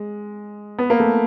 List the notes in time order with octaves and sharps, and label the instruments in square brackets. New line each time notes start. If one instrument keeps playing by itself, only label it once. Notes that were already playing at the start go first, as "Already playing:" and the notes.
Already playing: [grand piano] G#3
B3
A#3
A3